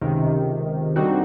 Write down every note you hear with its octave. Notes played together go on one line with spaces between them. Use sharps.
C#2 C3 D#3
D3 G3 C4 D#4 F#4